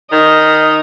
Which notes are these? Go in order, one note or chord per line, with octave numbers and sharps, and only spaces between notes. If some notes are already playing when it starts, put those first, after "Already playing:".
D#3 D#5